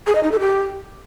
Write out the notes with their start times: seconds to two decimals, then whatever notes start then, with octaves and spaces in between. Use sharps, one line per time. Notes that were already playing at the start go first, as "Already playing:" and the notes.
0.07 G#4
0.15 D#5
0.23 D#4
0.32 A4
0.40 G4